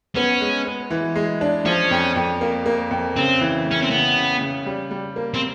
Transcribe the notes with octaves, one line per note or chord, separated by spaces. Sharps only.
B3 C#4
G#3
B3
E3
G#3
D4
F3 C#4
F2
F2
A#3
A#3
F2
C#3 C4
E3
C#3
C#4
C4
C#3 B3
C#3
C#3
G3
G3
A#3
C4